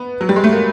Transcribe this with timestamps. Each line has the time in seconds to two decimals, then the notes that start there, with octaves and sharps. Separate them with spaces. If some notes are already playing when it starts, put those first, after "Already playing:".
Already playing: B3
0.21 F#3
0.29 G3
0.36 G#3
0.44 A3
0.53 A#3